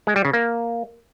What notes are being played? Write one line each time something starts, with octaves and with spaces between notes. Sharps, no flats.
G#3
G3
C#3
A#3